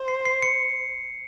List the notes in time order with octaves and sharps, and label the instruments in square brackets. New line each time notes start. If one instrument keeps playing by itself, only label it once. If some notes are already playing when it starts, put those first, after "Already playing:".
Already playing: [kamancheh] C5
[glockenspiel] C7
C7
C#7